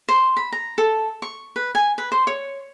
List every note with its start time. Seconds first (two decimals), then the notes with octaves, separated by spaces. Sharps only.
0.09 C5
0.37 B5
0.52 A#5
0.78 A4
1.22 C#6
1.56 B4
1.75 G#5
1.98 B4
2.12 C5
2.27 C#5